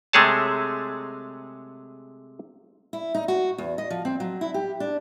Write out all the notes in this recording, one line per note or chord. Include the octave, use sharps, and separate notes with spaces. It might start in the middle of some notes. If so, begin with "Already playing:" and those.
C3 G#3 A3 G#4 C#5 A5
E4
D#4
F#4
E2
D#5
F3
C4
F#3
E4
G4
D4